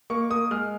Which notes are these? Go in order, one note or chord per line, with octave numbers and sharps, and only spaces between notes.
A#3 C#6
A#3 D#6
G#3 F6